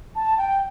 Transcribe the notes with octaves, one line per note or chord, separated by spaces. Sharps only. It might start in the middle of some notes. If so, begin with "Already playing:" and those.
A5
G5